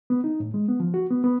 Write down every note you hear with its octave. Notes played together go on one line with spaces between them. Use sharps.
B3
D#4
A2
G#3
B3
F3
F#4
B3
B3